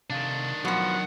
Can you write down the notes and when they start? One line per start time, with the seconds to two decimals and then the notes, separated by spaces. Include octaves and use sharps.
0.10 C3 D#3 D4 F5
0.65 B2 F3 F#3 F#5